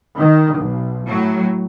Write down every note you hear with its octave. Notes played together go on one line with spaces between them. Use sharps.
D#3
B1
A2 F#3